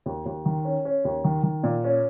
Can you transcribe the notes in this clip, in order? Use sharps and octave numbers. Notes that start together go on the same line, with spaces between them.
D#2
D#2
D#3
C#4
C#4
D#2
D#3
D#3
A#2
C#4